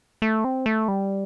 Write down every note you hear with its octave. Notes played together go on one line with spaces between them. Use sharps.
A3
C4
A3
G3